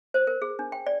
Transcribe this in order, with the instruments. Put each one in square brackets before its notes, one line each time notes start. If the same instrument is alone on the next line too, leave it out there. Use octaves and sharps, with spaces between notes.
[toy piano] C5
A#4
G#4
D4
G5
D5